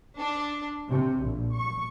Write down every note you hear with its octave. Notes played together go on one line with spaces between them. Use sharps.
D4
C3
A#1
C#6